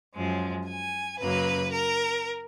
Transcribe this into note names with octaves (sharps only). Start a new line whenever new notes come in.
F#2 F3 G#3
G#5
F#2 C#3 F#3 A#3 B4
A#4